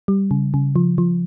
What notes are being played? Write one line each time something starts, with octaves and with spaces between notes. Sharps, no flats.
G3
C#3
C#3
F3
F3